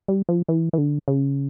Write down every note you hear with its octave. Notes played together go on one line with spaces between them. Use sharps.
G3
F3
E3
E3
D3
C#3